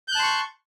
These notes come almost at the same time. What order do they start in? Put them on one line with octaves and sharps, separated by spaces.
G6 F#6 A5 C6 C#6